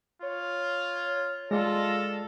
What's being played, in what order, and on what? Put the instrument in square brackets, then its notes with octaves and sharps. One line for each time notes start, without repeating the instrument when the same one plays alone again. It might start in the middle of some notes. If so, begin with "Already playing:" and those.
[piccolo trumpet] F4 [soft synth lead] C#5
[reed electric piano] G#3 D5 [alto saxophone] F4 [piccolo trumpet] A4 [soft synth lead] A#6